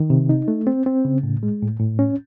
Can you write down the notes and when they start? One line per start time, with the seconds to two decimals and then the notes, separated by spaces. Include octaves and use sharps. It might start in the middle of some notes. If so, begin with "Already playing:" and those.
Already playing: D#3
0.10 C3
0.29 D#4
0.48 A3
0.67 C4
0.86 C4
1.05 C#3
1.23 A2
1.43 G#3
1.62 A2
1.80 A2
1.99 C#4